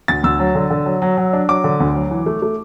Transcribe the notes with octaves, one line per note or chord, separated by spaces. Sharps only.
D2 A6
D2 E6
F#3
D3
D3
F#3
F#3
F#3
D4
F#3 D6
D3
D2
F#3
E3
A3
A3